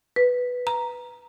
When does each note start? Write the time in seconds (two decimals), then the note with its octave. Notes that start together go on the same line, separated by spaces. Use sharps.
0.16 B4
0.67 A#5